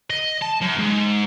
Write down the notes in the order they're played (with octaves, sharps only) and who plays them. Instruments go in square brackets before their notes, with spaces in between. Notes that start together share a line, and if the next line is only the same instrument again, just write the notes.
[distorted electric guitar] D#5
A5
F#2
G#2